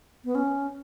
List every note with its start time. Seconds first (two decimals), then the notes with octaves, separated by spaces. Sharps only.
0.25 B3
0.35 C#4